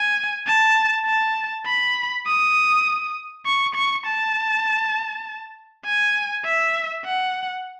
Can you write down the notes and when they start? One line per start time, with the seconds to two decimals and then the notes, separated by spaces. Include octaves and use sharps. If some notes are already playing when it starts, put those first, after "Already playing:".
Already playing: G#5
0.46 A5
1.06 A5
1.66 B5
2.26 D#6
3.46 C#6
3.75 C#6
4.06 A5
5.85 G#5
6.45 E5
7.05 F#5